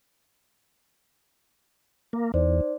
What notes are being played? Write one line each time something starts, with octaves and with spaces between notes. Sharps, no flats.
A#3
E2 D#4 C5 D5